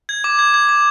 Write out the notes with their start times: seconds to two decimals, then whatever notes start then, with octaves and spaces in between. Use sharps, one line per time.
0.09 G#6
0.24 D6
0.39 G#6
0.54 G#6
0.69 D6